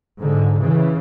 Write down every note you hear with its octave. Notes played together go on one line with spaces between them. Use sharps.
G#2 D3
C#3 E3